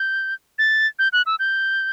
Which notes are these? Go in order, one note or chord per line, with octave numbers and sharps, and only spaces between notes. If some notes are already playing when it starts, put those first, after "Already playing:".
Already playing: G6
A6
G6
F#6
E6
G6